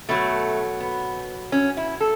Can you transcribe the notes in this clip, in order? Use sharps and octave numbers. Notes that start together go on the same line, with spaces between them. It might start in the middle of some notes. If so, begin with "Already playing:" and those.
B2 F#3 A3
B3
C#4
E4
A4